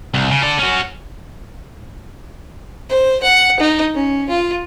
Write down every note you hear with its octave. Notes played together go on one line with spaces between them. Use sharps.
C2
C#3
A4 D5
C#4 F#4
C5
F#5
D#4
C#4
F4